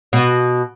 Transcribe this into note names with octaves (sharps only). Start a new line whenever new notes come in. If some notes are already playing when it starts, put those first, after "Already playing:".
B2